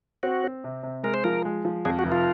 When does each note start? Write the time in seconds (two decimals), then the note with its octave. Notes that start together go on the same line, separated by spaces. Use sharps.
0.23 C4 F#4
0.44 C4
0.64 C3
0.83 C3
1.03 G#3 A#4
1.14 C5
1.24 F3 A#4
1.45 G#3
1.65 F3
1.85 F2 G#4
1.99 F#4
2.05 F1
2.12 F4